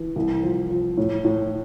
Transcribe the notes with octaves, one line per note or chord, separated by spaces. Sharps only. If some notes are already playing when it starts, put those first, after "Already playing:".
Already playing: E3
C2
F3
F3
A2
A2